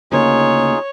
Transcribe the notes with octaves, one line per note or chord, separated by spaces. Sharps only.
D2 C#3 A#3 D#4 F4 G#4 C#5